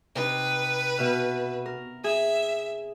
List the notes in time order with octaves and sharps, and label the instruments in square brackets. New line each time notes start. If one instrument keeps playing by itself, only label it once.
[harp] C3 D#4 [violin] B4
[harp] B2 E5 F6
A#4
[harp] G#4 [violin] E5